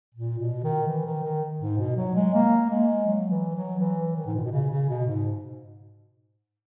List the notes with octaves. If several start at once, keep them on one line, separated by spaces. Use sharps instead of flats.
A#2
B2
D#3
E3
D#3
D#3
G#2
B2
F#3
G#3
A#3
G#3
F#3
E3
F#3
E3
D#3
G#2
A#2
B2
C#3
C#3
B2
G#2